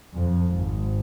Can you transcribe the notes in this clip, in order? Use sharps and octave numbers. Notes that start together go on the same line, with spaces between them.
F2
G#1